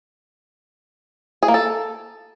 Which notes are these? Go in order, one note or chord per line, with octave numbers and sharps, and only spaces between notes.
G#4
A#3
A4